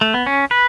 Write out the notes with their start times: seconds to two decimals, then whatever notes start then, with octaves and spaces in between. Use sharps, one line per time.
0.01 A3
0.14 B3
0.26 C#4
0.51 B4